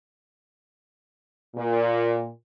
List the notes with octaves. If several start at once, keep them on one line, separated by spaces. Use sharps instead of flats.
A#2